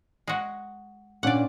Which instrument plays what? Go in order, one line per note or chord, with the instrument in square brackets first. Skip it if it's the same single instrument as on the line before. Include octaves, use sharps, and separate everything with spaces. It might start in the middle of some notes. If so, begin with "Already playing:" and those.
[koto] G#3 F#4
[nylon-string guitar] A#2 C#4 D4 [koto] D5 F#5